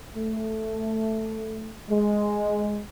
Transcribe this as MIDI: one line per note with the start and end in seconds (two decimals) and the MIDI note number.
0.16 1.73 57
1.88 2.81 56